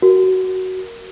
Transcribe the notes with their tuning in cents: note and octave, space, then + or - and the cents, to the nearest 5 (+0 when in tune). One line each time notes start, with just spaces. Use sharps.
F#4 +15 A#4 +0